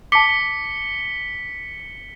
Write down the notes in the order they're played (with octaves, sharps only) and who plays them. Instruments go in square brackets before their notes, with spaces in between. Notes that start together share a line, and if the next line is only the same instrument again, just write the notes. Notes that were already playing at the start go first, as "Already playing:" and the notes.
[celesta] A5 D6 [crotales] B6 C#7 G7